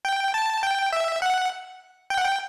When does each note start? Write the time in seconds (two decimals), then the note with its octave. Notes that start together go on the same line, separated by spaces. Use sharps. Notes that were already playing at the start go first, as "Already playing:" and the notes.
0.05 G5
0.34 A5
0.63 G5
0.93 E5
1.22 F#5
2.10 G5
2.17 F#5
2.24 G5